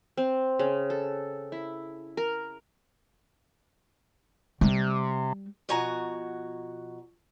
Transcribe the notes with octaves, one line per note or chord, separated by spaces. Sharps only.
C4
C#3
A4
E4
A#4
C3 G3
B2 F3 F#4 G#5 A#5